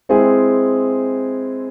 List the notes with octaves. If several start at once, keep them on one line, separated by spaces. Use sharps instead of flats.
G#3 C4 E4 G#4